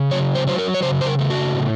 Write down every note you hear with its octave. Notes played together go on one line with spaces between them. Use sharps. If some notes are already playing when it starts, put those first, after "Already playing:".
Already playing: C#3
F#3 C#5
C5
F#3 C5
A#4
C#5
C#3 C5
C5
A#4
A3
F#4
A2